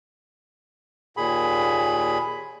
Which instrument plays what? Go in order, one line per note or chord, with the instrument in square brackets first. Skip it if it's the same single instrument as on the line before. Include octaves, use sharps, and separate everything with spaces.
[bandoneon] D#2 A#2 G#4 B5